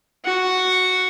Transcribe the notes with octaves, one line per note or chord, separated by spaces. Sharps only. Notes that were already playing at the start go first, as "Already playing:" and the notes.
F#4 F#5